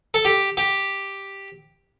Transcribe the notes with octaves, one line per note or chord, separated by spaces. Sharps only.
A4
G4
G4